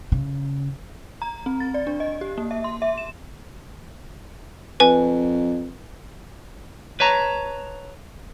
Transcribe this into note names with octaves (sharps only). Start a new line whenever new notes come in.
C#3
A#5
C4
A6
D5
D4
D#5
G4
A#3
E5
C6
E5
E7
F2 B4 G#5
B4 C#5 A5 A#5